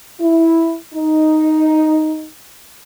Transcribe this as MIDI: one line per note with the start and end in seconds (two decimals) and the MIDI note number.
0.19 0.74 64
0.93 2.27 63